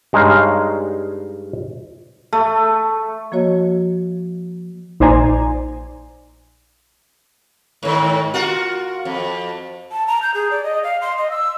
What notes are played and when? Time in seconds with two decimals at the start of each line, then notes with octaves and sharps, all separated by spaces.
0.13 G2 G#3 D#4 C#5 F5
2.33 A3
3.32 F3 A#3 F#4 C#5 D#5
5.00 A#1 D#4 C5 D5 G#5 A#5
7.83 G#2 D#3
8.34 F4 F#4 A#4
9.05 F2
9.92 A5
10.07 A#5
10.22 G6
10.34 G#4
10.51 D5
10.64 D#5
10.83 F5
11.01 C6
11.18 D#5
11.30 E6